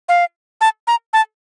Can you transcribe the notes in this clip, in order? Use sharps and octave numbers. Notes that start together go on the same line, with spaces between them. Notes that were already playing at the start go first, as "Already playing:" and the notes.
F5
A5
A#5
A5